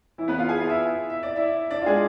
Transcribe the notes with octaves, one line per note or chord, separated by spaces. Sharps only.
E3 E4
B3 B4
F4 F5
G#4 G#5
F4 F5
E4 E5
E5
D5
E4 E5
D4 D5
F4
G#3 G#4